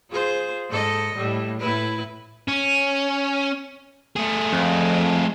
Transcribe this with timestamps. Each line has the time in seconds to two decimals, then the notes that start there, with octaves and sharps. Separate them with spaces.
0.10 F4 G#4 C5
0.70 G#2 A4 D#5
1.16 A2 G3
1.59 A2 E4 B4
2.48 C#4
4.16 A3 G#4
4.53 F2